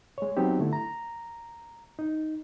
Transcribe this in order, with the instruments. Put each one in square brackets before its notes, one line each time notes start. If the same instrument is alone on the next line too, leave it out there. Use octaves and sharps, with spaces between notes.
[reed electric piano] G#3 C#5
F#3 B3 C4 D#4 G4
D3 A3 E4
A#5
D#4